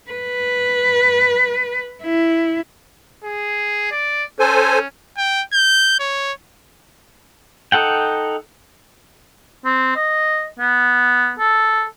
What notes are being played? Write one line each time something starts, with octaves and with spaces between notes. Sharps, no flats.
B4
E4
G#4
D5
C#4 A4 C5 G#5
G5
G6
C#5
D#4 A4 F#5 G5
C4
D#5
B3
A4